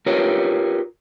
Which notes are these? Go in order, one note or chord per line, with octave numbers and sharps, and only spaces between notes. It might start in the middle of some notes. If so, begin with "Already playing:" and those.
F4 G4 A#4 B4 C#5